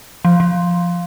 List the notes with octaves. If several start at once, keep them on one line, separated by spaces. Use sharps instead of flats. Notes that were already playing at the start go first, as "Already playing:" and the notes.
F3
F3